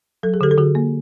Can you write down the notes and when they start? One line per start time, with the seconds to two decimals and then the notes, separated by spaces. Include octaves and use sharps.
0.23 F#3 A4
0.34 G#4
0.41 D3 G4 A4
0.51 A4
0.58 D3 F#4 G#4
0.75 A#3